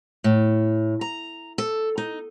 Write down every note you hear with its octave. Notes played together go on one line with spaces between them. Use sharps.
A2
A#5
A4
D#4